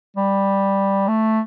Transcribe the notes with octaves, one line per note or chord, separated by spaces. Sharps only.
G3
A3